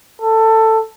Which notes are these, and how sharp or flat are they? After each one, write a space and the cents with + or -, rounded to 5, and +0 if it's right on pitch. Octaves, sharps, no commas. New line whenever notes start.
A4 +15